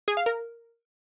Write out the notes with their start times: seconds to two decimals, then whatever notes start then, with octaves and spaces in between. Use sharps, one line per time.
0.08 G#4
0.17 F5
0.26 A#4